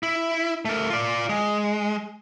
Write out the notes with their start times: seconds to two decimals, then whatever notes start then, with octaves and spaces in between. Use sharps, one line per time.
0.03 E4
0.65 A3 A#4
0.90 F4 D5
1.29 G#3